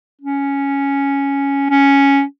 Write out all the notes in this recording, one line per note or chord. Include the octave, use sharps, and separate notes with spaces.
C#4
C#4